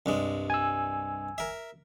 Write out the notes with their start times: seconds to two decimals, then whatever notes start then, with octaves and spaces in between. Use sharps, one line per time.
0.06 C2 G2 G#3
0.50 G#5 E6
1.38 A#4 E5